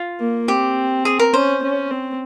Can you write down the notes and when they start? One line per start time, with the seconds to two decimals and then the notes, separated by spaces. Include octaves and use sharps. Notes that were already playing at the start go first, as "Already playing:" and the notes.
Already playing: F4
0.20 A#3
0.48 C4 G4
1.05 G#4
1.19 A#4
1.34 C#4 C5
1.62 C#4
1.91 C4